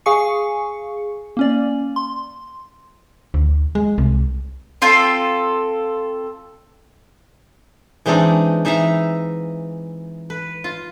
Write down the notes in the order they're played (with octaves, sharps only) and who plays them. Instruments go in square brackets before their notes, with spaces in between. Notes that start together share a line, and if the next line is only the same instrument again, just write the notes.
[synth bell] G#4 F5 G#5 C#6 C#7
A#3 C#4 D5
C6
[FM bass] D2
G#3
C2
[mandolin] C4 F4 A4
[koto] E3 G#3 C4 D4 D#4
E3 D#4 E5 F5 A#5
B4
F4